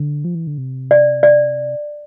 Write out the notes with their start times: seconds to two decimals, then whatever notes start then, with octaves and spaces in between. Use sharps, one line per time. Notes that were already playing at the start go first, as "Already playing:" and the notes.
Already playing: D3
0.24 F3
0.35 E3
0.47 D3
0.58 C3
0.91 D5
1.23 D5